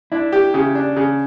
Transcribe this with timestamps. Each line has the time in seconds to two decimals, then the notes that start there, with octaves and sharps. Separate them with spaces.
0.12 D4 E4
0.32 G4
0.54 C#3
0.75 D4
0.97 C#3